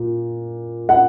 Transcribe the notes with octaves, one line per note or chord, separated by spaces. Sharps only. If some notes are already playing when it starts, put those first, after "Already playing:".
Already playing: A#2
F#5